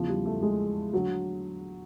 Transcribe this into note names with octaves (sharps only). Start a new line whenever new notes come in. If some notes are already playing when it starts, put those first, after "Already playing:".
Already playing: E2 C#3 E3 F3
G3
A3
G#3
D3 F#3